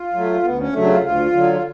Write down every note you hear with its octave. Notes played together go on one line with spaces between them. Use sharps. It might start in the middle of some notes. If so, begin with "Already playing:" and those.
Already playing: F4
F#3 A3
D2 B3
C#4
C#3 F#3 A3 D4
D4
F4
D2 F4
D3 F#3
F4